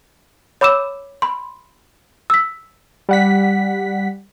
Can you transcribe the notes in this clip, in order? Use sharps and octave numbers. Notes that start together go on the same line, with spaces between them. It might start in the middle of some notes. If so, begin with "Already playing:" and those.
C#5 B5 D6 E6 E7
B5 C6
E6 B6
G3 F#5 B6